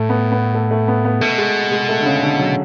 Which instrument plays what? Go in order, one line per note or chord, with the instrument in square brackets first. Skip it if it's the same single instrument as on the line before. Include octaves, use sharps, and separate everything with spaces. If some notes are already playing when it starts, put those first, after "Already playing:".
Already playing: [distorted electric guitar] A2 [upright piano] A3
[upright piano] B3
B3
A3
A3
B3
B3
[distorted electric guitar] B2 [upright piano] A3
[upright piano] G#3
G#3
A3
D3
C#3
D3
F#3